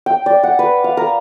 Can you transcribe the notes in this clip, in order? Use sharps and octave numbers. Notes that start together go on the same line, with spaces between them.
G5
D5
F#5
B4
F5
A#4